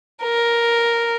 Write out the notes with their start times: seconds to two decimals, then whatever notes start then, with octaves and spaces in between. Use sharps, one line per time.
0.23 A#4